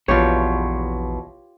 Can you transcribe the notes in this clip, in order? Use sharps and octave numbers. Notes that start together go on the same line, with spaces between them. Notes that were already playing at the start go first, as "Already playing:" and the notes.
A#1 E2 B2 F4 G4 C#5